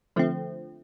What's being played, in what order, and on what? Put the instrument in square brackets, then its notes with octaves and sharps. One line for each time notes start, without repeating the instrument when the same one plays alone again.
[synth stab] D3 F3 A3 C4